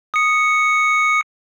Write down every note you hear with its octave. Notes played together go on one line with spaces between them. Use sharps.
D#6 C#7